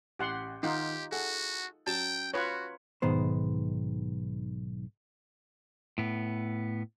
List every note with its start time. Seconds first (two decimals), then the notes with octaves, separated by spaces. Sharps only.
0.19 A1 G4 F#5 C6
0.63 D#3 D#4 F4 G4 F#5
1.12 F#4 G#4 A4 F#5
1.87 F#3 C#4 G5 A5
2.34 F4 F#4 B4 C#5
3.02 B1 G#2 D#3 B3 C5
5.98 A2 B3